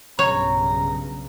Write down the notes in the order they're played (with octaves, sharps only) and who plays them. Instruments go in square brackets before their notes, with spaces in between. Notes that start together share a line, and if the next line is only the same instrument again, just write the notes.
[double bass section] B1 G2 C#3 [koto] C#5 [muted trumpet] A#5